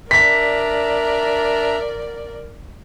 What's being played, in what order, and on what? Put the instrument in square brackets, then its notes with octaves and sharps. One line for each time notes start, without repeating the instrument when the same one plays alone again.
[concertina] D4 E5 A#5 [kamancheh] A#4 D5 [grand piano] B6